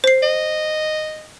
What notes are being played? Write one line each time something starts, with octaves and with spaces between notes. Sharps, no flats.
C5 C7
D#5